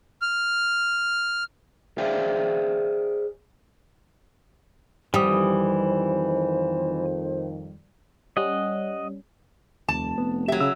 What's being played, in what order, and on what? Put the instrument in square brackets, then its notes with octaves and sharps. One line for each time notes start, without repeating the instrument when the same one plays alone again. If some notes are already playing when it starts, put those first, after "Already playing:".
[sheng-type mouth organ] F6
[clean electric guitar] G#4 C5 D5 E5 F5 G5
[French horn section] F2 D#3 [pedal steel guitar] E3 D#6 [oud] G3 [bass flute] C5
[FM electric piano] G3 C#4 [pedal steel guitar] D#5 F#5
[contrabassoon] F1 [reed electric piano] D#2 [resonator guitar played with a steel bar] A5
[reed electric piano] B3
[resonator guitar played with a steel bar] F#3 E5 [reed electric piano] G4
[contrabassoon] C#3 [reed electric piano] E6